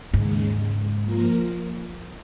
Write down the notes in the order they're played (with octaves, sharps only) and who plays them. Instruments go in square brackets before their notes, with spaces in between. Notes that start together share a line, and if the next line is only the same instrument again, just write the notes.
[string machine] D#2 C#3 G#3 [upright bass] G#2
[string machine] F3 A#3 F4 A#4